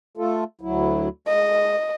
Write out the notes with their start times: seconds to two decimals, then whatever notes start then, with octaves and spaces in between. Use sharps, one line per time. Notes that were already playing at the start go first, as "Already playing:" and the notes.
0.17 A3 F4 A4
0.61 D2 F#3 E4
1.27 G#3 D#5